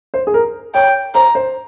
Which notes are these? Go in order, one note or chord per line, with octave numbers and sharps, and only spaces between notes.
C5
G#4
A#4
C#5 G5
C5 A#5
C5